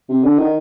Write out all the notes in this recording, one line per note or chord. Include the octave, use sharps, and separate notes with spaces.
C3
D3
D#3